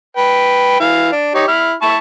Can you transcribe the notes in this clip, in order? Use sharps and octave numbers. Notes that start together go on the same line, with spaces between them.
B4 G5
E3 F5
D4
D#4 G4 C#5
E4 F6
E4 A5 C#6